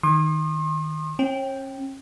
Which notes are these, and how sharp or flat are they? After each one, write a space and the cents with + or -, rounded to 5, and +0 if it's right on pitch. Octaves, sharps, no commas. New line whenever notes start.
D#3 +0 C6 +40 D#6 -40
C#4 -40 G5 +0